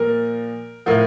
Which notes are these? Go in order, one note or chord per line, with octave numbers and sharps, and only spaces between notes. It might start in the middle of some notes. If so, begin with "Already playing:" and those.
Already playing: A#2 F3 A#4
A2 F3 A#4